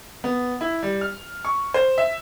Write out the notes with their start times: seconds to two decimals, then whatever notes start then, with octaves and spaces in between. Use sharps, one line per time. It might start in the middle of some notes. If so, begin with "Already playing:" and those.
0.24 B3
0.61 E4
0.83 G3
1.01 F6
1.45 C#6
1.74 C5
1.98 E5